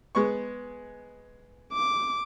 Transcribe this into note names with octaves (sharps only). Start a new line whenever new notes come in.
G#3 B3 C#6
D6